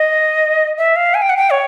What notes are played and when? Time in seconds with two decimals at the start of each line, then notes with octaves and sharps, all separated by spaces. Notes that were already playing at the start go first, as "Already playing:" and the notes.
Already playing: D#5
0.78 E5
0.96 F5
1.14 G#5
1.22 G5
1.30 F#5
1.37 G5
1.50 C#5